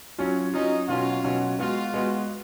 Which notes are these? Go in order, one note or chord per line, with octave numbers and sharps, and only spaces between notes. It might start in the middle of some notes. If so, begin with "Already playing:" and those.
F#3 C#4 F4
F#3 C#4 D#4 F4
B2 F#3 C#4 F4 F#4
B2 F#3 C#4 F#4
G#3 B3 F4 F#4
G#3 B3 F#4